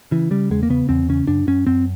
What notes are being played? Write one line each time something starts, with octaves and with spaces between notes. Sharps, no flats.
C#3 E3
C#3 G3
E2 G#3
A#3
C#3 B3
E2 C4
C#3 C#4
F#2 D4
F#2 C#4
F#2 C4